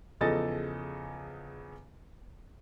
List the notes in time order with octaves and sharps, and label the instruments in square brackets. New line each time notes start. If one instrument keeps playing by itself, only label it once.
[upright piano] E2 C#3 F3 A4 D#5 A6